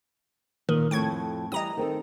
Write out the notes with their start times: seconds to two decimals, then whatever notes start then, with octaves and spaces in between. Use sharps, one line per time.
0.69 A#2 D#3
0.91 F2 A2 G5 C#6 G#6
1.52 E3 G3 D#5 A#5 D#6
1.77 D#3 C4 A4